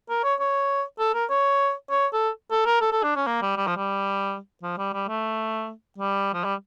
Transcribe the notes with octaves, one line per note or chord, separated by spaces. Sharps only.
A#4
C#5
C#5
A4
A#4
C#5
C#5
A4
A4
A#4
A4
A4
D4
C#4
A#3
G3
G3
F3
G3
F3
G3
G3
A3
G3
F3
G3